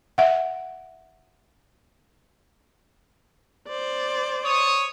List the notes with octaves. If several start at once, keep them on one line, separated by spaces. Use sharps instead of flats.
E5 F#5
C5 D5
C#5 D#6